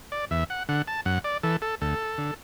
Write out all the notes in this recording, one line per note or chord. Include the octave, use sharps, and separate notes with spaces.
D5
E2 E5
F#5
D3 F#5
A5
F#2 F#5
D5
E3 A4
A4
D2 A4
D3